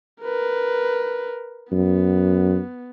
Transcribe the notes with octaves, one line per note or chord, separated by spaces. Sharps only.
A#4 B4
F#2 B3